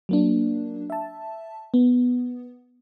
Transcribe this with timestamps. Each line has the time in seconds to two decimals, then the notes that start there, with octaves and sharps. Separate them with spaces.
0.09 F#3 A#3 D4
0.90 E5 A5
1.74 B3